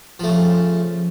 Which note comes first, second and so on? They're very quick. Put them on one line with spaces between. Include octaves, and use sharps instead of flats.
F3 A3 C#3